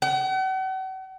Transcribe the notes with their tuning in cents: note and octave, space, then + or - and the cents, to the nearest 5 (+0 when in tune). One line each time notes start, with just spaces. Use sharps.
F#5 +40